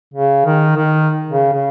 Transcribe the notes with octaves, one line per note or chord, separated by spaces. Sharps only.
C#3
D#3
D#3
C#3
C#3